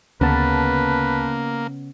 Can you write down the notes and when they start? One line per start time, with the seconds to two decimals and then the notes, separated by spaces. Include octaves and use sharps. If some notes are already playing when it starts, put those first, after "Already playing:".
0.21 D2 C#3 A#3 B3 B4 A5